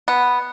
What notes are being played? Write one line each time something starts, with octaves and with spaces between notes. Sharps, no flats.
B3